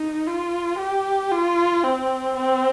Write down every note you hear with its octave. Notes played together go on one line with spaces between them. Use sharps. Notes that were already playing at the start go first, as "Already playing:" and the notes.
Already playing: D#4
F4
G4
F4
C4
C4